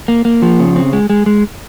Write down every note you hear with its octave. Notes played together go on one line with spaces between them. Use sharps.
A#3
A#3
F3
C#3
C4
G#3
G#3
G#3